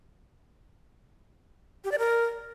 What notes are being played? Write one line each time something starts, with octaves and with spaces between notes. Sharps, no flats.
G4
D5
A#4